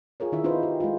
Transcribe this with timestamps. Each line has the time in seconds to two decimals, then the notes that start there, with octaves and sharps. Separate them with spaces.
0.20 F4 G#4 A#4 C#5
0.32 D#3 E4 E5
0.44 C4 D#4 F4 B4 C5
0.63 G4
0.80 G#3 F4